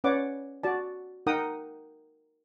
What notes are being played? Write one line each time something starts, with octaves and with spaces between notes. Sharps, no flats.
C#4 B4 C#5 D5 F#5 D6
F#4 D5 A5
D#4 A#4 F#5 G5 A#5 D#6